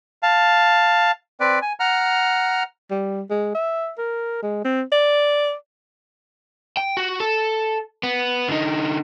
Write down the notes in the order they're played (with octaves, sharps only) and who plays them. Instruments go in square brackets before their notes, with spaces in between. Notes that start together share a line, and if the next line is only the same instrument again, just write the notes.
[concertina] F5 A5
C4 B4 D5
G#5
F#5 A#5 F6
[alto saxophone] G3
G#3
E5
A#4
G#3
C4
D5
[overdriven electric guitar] G5
F#4
A4
B3
D3 D#4